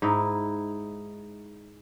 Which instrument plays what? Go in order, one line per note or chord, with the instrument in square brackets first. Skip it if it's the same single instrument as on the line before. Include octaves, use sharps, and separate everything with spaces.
[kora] G#2 D#4 E4